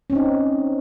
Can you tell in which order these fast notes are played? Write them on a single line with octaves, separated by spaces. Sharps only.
C#4 C4 D#4